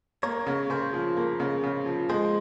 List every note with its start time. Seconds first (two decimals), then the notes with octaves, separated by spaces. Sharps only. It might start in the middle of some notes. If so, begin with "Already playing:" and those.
0.23 A#3 A#4 C#5
0.47 C#3
0.70 C#3 G#4 C5
0.93 F3
1.17 A#3
1.40 C#3
1.63 C#3
1.86 F3
2.10 G#3 G#4 C5